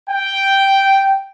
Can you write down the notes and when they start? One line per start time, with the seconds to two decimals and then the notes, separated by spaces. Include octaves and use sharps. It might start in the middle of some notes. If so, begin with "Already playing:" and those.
0.10 G5